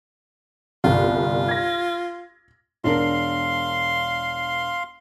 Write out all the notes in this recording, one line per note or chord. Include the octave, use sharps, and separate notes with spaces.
G1 C2 F4
G#6 A#6
E1 D4 A#4 F5 C6